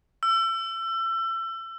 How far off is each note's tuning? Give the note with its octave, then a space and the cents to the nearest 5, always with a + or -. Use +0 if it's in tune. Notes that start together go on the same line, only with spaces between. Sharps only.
E6 +30